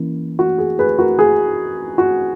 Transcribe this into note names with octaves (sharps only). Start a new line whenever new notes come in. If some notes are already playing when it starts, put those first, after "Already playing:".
Already playing: E3 A#3 C#4
F#4
G#4
G#4 B4
F#4 A#4
G#4
F#4